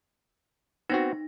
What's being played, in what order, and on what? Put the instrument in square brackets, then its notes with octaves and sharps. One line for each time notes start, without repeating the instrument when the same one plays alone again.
[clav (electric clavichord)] B3 C4 F#4 [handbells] D#4 A#6